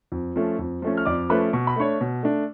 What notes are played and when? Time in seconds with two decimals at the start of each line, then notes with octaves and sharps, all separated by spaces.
0.12 F2
0.36 F3 A3 C#4
0.59 F2
0.82 F3 A3 C#4
0.97 F6
1.05 F2 D5 D6
1.29 F3 A3 C#4 B4 B5
1.53 B2 C#6
1.67 B5
1.76 A3 D4 C#5 C#6
2.01 B2
2.23 A3 D4